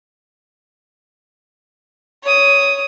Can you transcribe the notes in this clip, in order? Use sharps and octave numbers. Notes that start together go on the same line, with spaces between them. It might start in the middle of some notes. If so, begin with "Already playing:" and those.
C#5 D#6